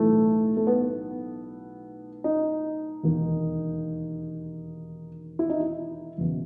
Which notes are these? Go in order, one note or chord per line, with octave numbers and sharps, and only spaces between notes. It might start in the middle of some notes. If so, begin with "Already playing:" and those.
Already playing: B1 A2 E3 A3
A3
B3
D#4
E1 D#2 D#3
E4
D#4
E4
F#1 E2 B2